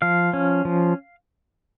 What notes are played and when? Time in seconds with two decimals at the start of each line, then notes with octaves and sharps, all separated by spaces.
0.02 F3 F5
0.33 C#4
0.65 F3